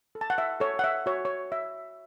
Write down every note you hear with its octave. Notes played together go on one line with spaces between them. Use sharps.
A4
A5
F#5
E5
A4 C#5
F#5
E5
F#4 C#5
C#5
C#5 E5